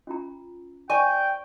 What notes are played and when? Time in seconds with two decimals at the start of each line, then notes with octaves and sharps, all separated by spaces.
0.07 C#4 F4 A#5
0.90 C5 D5 G5 G#5 C#6